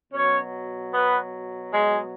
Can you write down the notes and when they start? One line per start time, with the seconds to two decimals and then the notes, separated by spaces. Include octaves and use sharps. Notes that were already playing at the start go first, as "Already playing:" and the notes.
0.12 B2 F#3 C#4 C#5
0.92 B3 B4
1.72 G#3 G#4